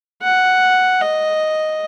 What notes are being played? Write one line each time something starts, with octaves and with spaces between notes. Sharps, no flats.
F#5
D#5